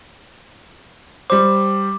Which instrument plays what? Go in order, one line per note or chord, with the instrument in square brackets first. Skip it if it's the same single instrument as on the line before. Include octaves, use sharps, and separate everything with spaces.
[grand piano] G3 C5 [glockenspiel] D6